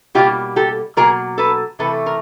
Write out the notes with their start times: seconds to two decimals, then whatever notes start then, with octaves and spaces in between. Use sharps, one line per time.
0.15 B2 G3 A#3 F4 G4
0.56 G4 A4
0.97 B2 F#3 A#3 G#4 A#4
1.38 A4 B4
1.79 C3 E3 A3 A4 B4
2.06 A#4